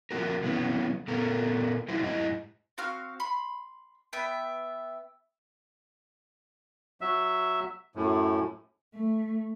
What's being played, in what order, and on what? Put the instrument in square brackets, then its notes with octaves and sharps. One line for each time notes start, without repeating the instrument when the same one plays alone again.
[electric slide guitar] F3 G3 A#3 F#4 A#4
C3 E3 F#3 G#3 B3 C#4
A#2 B3 A4 A#4
F#3 D#4 E4 C5
G#2 E4 D#5
[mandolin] C4 F#4 F5 F6
B5 C6
B3 E5 G5
[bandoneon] F#3 E5
F#2 A2
[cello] A3